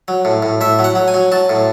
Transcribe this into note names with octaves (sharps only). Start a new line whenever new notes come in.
F#3
A2
A2
A2 E5
F#3
F#5
F#3
G#5
F#3
F#3 A5
A2